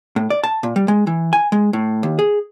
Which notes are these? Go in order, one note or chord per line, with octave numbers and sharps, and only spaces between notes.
A2
D5
A5
A#2
G3
G#3
E3
G#5
G#3
A2
D#2
G#4